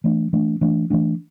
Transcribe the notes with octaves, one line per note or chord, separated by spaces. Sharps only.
E3 A3 D4
E3 A3 D4
E3 A3 D4
E3 A3 D4